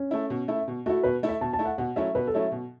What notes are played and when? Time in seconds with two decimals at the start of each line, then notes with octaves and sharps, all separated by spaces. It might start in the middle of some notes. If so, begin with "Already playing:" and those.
Already playing: C#4
0.11 A3 E4
0.30 B2
0.48 A3 E4
0.68 B2
0.86 A3 E4 F#4
1.03 B2 B4
1.23 A3 E4
1.29 E5
1.41 B2 A5
1.53 A5
1.59 A3 E4
1.66 F#5
1.78 B2 F#5
1.96 F#3 A3 C#4 E4 E5
2.15 B2 B4
2.27 A4
2.34 F#3 A3 C#4 E4
2.52 B2